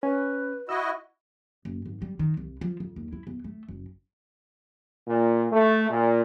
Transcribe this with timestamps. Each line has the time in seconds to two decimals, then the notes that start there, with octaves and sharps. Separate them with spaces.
0.03 C#4 B4
0.69 E4 F#4 D#5 E6
1.65 F#1
1.86 G#1
2.02 G3
2.19 D#3
2.37 C2
2.61 F3
2.80 F2
2.96 D#2
3.13 E4
3.27 E2
3.44 A3
3.68 F#1
5.07 A#2
5.51 A3
5.89 A#2